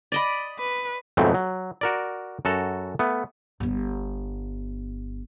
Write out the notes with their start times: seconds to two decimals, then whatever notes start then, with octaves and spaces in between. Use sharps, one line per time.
0.12 D5 D#5 B5
0.59 B4
1.17 F2 G#2 B2 F#3 A3 C4
1.34 F#3
1.81 F#4 A#4 D5
2.45 F#2 F#4 A4 A#5
2.99 A3 B3
3.60 G1 B3